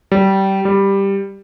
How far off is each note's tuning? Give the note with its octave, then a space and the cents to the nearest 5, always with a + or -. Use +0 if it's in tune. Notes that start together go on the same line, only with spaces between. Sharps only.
G3 -20
G3 +5